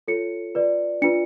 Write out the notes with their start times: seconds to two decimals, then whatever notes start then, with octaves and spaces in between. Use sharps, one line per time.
0.08 F4 A4 C#5 C#7
0.55 F4 B4 D5
1.02 D4 F4 B4 D5 C#7